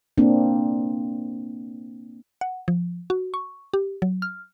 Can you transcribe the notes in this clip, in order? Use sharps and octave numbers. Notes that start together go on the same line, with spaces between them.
A#3 C4 D4
F#5
F3
F#4
C#6
G4
F#3
F6